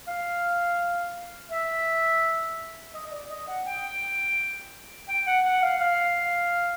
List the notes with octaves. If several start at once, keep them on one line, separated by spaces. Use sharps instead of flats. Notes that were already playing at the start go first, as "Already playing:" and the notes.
F5
E5
D#5
D#5
D5
D#5
F#5
G5
G5
F#5
F#5
F5
F5